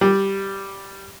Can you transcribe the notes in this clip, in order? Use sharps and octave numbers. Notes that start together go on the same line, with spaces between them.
G3